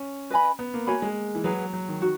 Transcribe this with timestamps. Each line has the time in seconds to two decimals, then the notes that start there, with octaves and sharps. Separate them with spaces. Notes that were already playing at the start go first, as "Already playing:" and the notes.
Already playing: C#4
0.30 B4 D#5 G#5 B5
0.59 B3
0.74 A#3
0.87 A#3 F#4 C#5 G#5 B5
1.02 G#3
1.35 E3
1.44 F#3 G#4 B4 F#5
1.73 F#3
1.88 D#3
2.02 D#3 F#4